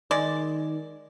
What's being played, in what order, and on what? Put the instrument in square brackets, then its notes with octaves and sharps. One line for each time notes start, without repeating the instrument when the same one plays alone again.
[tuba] D#3 [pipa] G#3 D5